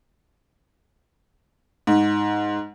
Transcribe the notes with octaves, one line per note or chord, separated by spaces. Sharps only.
G#2